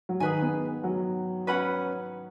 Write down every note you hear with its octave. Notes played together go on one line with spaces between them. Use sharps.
F#3
D#3 G#4 B4 G#5
B3
F#3
C#4 B4 F#5 B5